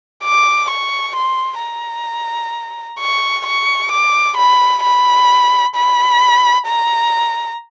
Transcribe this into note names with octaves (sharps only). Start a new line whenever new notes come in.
D6
C#6
C6
A#5
C#6
C#6
D6
B5
B5
B5
A#5